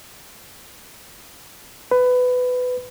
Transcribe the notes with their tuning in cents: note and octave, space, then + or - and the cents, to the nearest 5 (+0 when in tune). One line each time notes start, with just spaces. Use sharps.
B4 +20